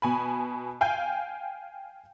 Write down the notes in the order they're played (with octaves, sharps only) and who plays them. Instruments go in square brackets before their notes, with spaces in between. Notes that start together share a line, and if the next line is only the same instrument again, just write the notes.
[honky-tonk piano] B2 G#5 B5
F5 G5 G#5 G6